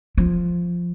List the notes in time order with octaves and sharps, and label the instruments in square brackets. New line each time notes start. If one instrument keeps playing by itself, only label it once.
[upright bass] F3